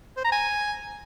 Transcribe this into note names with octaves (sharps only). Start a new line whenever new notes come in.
C5
A#5
G#5